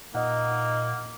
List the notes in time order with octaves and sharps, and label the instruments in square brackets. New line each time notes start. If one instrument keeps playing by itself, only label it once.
[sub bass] A#2 [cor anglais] A#3 [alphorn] D#4 [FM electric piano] D#5 F#5